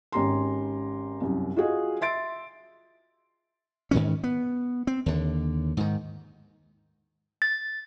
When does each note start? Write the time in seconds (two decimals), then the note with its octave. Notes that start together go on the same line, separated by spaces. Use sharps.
0.12 G#1 C#4 G4 A#5 C6
1.21 C2 F#2
1.56 F4 F#4 G#4 D#5
2.01 E5 C6 A6 D7
3.91 G#2 D#3 E3 C#4
4.24 B3
4.87 C4
5.06 D#2 D3
5.77 G#2 D#3
7.42 A6